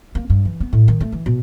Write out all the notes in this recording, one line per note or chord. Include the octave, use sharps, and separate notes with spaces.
A#3
G2
E3
B3
A2
D#3
A3
E3
B2